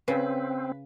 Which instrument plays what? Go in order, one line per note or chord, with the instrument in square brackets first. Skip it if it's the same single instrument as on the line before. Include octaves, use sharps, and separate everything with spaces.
[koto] C#3 [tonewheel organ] C4 [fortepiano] B4